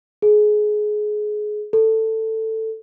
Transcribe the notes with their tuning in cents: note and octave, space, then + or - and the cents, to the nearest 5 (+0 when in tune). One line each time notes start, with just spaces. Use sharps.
G#4 +20
A4 +10